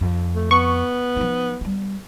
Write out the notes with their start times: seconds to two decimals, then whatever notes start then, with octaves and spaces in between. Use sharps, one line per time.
0.01 F2
0.35 A3
0.51 B3 C#6
1.17 F3 D#4
1.61 G3 B3